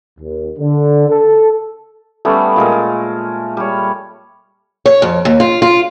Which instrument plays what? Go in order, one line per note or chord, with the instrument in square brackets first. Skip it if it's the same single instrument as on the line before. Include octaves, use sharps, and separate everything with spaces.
[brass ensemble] D#2
D3
A4
[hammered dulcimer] G3 B3 C#4 [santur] A3
[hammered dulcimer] A#2 G#3 A#4
G3 C#5
[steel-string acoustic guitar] C#5
F2
D#2
F4
F4